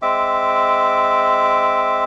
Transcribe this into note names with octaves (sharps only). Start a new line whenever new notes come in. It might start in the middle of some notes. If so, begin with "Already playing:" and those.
G#3 C4 E5 D6